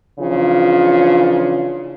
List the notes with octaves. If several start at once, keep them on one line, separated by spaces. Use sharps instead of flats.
C#3 E3 F3 D4 F4